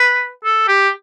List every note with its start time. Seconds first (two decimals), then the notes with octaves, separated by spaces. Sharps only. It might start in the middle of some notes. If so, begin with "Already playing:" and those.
Already playing: B4
0.44 A4
0.68 G4